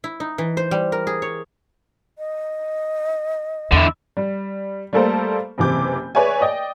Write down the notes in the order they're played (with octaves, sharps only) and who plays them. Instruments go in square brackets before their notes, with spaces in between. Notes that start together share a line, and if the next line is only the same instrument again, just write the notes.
[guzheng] E4
D#4
E3
C5
G3
A#4
G#4
C#5
[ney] D#5
[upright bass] E2 [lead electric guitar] D3 E4
[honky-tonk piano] G3
G3 A3 A#3 A4 A#4 C5
F#1 C3 E3 D6 G6
G#4 B4 C#5 D5 E5 G#5
D5 D#5 G5